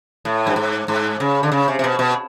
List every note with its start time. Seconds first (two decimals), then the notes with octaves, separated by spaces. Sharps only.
0.25 A2
0.47 G2
0.56 G#2
0.88 G#2
1.20 C#3
1.43 D3
1.52 C#3
1.68 C3
1.79 C3
1.84 B2
1.99 B2